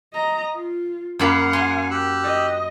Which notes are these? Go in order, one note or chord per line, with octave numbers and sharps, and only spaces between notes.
D#5 A#5
F4
F#2 A#3 F5 F#5 B5
G#5 C6
G4 E6 F#6
D#5